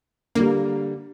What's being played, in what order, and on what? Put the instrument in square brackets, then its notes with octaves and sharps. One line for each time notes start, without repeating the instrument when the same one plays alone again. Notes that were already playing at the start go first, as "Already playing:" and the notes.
[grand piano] D3 G3 [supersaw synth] A#3